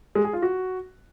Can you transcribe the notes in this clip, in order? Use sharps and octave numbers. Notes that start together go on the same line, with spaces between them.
G#3
G#4
F4
F#4